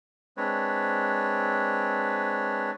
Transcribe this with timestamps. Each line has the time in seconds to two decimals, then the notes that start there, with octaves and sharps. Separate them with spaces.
0.37 G#3 C4 D4 B4 C#5